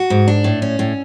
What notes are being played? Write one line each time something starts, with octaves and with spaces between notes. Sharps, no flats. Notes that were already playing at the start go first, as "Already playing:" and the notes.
Already playing: F#4
G#2
D4
A2
C#4
A2